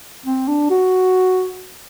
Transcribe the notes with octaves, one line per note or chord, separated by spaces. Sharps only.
C4
D4
F#4